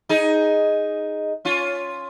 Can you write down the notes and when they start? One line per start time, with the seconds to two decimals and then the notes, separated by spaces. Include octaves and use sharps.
0.09 D#4 G#4
1.45 C#4 F4